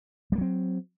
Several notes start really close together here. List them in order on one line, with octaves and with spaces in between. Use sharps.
G3 A#3 F#3 C4